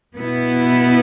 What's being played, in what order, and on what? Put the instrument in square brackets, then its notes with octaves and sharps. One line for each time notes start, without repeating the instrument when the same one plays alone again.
[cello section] B2 B3 E4